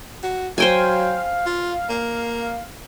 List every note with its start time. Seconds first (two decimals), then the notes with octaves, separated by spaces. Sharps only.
0.23 F#4
0.58 F#3 C5 F5 G5 G#5
1.46 F4
1.89 A#3